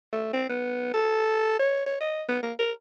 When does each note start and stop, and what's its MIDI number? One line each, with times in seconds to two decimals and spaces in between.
0.13 0.33 57
0.33 0.46 60
0.50 0.93 59
0.94 1.57 69
1.59 1.83 73
1.86 2.00 73
2.01 2.23 75
2.28 2.39 59
2.43 2.53 58
2.59 2.72 70